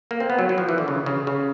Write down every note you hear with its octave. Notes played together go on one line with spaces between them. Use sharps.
A#3
C4
B3
F#3
F#3
F3
E3
D3
C#3
C#3
C#3